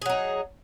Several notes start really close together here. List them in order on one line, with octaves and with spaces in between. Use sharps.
G#4 F#3 D#4